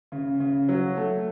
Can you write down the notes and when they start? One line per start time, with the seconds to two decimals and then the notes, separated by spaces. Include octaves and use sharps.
0.12 C#3
0.40 C#3
0.69 F#3
0.97 A3